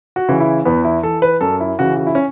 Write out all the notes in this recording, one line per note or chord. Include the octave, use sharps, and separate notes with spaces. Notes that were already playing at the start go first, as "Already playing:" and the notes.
F#4
C#3 E3
E4
E2 B3
E4
E3 A4
B4
F#2 A4
E4
C#3 E3 F#4
F#4
E4
C#4